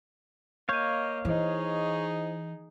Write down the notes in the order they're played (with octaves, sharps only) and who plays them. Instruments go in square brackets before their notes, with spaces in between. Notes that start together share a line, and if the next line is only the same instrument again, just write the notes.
[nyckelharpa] A#3 D#5 [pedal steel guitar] C#5 F5 [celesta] G6 D#7
[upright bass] E3 [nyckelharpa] D#4 G#4 [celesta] E4 C5 D#5